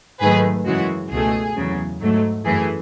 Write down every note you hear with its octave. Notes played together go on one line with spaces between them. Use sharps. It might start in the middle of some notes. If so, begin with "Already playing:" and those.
G#2 D#3 F#3 A3 G#4 B4
F#2 C#3 E3 G#3 F#4
C#2 B2 A3 G#4
E2 C#3 F#3
G#2 F#3 A3
F#2 E3 A3 G#4